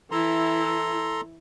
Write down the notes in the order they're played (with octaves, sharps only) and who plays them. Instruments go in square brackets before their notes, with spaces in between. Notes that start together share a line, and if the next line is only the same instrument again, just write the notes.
[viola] E3 E4 [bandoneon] A4 A#5 C6